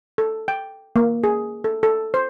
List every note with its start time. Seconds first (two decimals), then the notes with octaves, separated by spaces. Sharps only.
0.18 A4
0.48 G5
0.96 A#3
1.24 G#4
1.64 A4
1.83 A4
2.14 C5